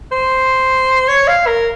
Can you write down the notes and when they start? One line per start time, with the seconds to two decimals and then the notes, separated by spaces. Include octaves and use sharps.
0.12 C5
1.09 C#5
1.28 F5
1.47 A#4